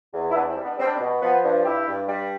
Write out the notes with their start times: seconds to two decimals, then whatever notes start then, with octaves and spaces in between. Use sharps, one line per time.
0.13 E2
0.30 E4
0.35 E2 B3 D4
0.50 C4 E4
0.57 G3
0.64 B3 D4
0.78 G3 C4
0.87 D4
0.96 C4
1.00 B2
1.21 F3 B3
1.43 G2
1.64 G2 E4 G4
1.87 G2
2.08 G3